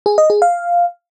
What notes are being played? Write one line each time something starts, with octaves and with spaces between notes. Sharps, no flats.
G#4
D#5
G#4
F5